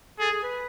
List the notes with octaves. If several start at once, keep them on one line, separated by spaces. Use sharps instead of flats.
G#4 A4
G#4
B4